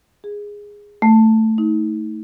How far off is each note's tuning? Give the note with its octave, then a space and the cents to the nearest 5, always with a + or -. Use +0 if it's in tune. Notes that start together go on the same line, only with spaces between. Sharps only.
G#4 -10
A3 +10
D#4 +35